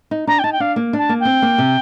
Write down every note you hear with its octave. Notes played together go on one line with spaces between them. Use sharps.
D#4
D4 A#5
G5
D#4 A5
G5
D4 F5
A#3
D4 A5
A#3
C4 G5
A#3
C3